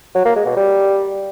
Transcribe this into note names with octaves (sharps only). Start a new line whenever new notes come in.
F#3
A#3
G#3
B2
G3